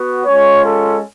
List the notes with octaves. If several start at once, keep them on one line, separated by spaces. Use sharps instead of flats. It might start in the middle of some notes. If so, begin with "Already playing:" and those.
Already playing: B3 F#4
G#3 C#4 F4 C#5
A4